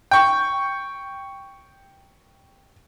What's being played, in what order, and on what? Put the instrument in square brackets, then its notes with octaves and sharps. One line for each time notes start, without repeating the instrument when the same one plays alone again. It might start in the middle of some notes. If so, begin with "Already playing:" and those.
[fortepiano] G5 C#6